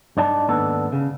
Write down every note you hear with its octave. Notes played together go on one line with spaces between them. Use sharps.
G2 D#4 D5 A5
D#2 G#2 B3 D4 A4
C#3